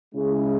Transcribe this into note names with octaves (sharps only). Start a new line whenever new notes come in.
C#3 G#3 C#4 E4 G#4